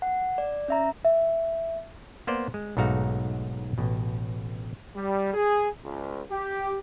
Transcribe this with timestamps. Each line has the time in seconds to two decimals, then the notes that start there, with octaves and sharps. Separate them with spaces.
0.02 F#5
0.38 D5
0.68 C#4 E5 A#5
1.05 E5
2.27 A#3 B3 C5 D5
2.54 G#3
2.77 B1 G#2 A3 D#4 F#4 F5
3.78 A1 B2
4.95 G3
5.34 G#4
5.84 C#2
6.31 G4